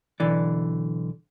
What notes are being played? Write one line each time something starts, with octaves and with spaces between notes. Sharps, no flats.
B1 D3 E3 D5